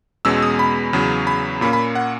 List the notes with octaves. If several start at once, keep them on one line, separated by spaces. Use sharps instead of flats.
E2 B2 G#3 C#4 E6
D#6
B5
E2 C#3 F#3
B5
A#2 A#3 C#4 B5
B5
F#5